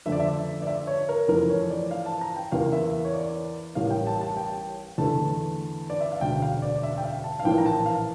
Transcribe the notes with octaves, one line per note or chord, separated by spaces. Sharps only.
F2 D3 A3 E5
D5
E5
D5
E5
C#5
A#4
F2 E3 A3 A#4
C#5
D5
F5
A5
A#5
G5
E2 E3 A#3 F5
E5
C#5
D5
A1 A2 G3 A#3 F5
G5
A5
A5
G5
E2 D3 A3 A5
D5
E5
F5
E1 D2 D3 G5
F5
D5
E5
G5
F5
A5
F5
A#1 A2 E3 A#3 G5
A#5
A5
F5